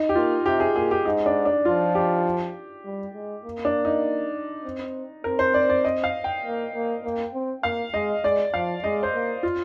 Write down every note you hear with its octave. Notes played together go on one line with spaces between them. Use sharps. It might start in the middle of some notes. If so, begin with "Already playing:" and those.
Already playing: D#4
G4
A#3 F4
C3 G4
G#4
A#2 G#4
G4
G#2 D#4
D4
D4
F3 F4
G4
G3
G#3
A#3
D4
D#4
C4
C4 A#4
C5
D5
D5
D#5
F5
G5
A#3
A#3
A#3
C4
A#3 F5
G#3 D#5
G#3 D5
F3 F5
G#3 D#5
C5
A#3
F4